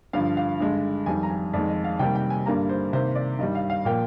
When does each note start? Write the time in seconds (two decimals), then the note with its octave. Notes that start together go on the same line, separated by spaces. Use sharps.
0.13 G2 D3 F3 F5
0.37 F5
0.60 G2 D3 G#3
1.06 F2 D#3 G3 G#5
1.23 A#5
1.30 G#5
1.53 F2 D#3 G#3 D5
1.68 D#5
1.84 F5
1.99 C3 D#3 G3 A#3 G5
2.15 G5
2.30 G#5
2.46 G2 D3 G3 A#3 A#5
2.69 C5
2.93 C3 D#3 A#3 C5
3.15 D5
3.39 G2 D#3 G3 D#5
3.55 F5
3.70 F5
3.85 A#2 F3 A#3 G5